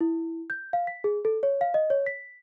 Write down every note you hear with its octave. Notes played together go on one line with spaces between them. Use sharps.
E4
G6
F5
B6
G#4
A4
C#5
F5
D#5
C#5
B6